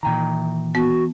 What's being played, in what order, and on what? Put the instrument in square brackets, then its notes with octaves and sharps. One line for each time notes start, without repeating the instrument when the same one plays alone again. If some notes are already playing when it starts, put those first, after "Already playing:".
[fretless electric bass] A#2 D#3 [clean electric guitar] E3 G5 A#5
[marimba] B3 [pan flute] F#4